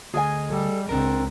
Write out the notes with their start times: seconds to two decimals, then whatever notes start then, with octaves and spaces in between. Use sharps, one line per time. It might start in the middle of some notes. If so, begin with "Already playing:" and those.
0.14 D2 G#4 D#5 G#5
0.49 G3 A4
0.89 C#2 C4 D4 A#4